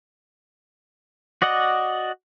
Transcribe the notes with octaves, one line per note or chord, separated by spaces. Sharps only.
F#4 D5 D#5 F#5